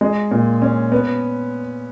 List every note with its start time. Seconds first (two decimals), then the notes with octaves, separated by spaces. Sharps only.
0.01 G#3
0.31 A#2
0.62 C#4
0.92 B3